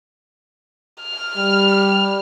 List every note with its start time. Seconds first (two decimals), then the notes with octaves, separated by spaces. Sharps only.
1.03 F6
1.37 G3